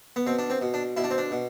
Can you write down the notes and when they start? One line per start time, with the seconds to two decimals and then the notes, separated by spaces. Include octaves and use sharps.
0.16 B3
0.26 B2 C4
0.39 D4
0.50 C4
0.61 B2
0.74 D4
0.96 B2 E4
1.04 D4
1.11 C4
1.18 D4
1.31 B2